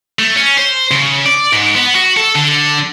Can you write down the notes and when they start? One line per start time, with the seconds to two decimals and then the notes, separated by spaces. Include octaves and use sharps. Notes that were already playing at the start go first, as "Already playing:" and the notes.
0.19 A3
0.36 C#4
0.57 C5
0.91 C#3
1.25 D5
1.53 G#2
1.75 B3
1.95 F#4
2.17 A4
2.35 D3